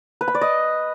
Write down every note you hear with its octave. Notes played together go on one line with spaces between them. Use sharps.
B4
B5
D5
D#5